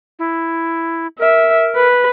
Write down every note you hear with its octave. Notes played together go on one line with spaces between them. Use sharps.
E4
A#4 E5
B4